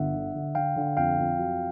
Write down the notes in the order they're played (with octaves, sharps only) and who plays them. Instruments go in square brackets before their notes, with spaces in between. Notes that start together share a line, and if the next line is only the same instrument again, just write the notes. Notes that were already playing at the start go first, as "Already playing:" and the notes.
Already playing: [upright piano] G1 [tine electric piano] E5 F#5
[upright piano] D3
D3
[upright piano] D3 [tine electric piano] F5 G5
[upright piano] D3
[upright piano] F2 [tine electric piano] F5 G5
[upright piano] F2
F#3